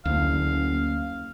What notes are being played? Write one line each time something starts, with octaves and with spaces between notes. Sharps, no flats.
F#1 D2 F5